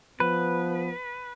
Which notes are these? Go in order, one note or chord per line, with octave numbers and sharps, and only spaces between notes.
F3 B3 B4